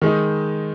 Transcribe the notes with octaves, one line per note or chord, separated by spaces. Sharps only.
D#3 G#3 D#4